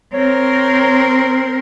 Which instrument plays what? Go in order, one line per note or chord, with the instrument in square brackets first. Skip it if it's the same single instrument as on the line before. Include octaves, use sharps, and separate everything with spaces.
[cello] C4 A#4 [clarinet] C#5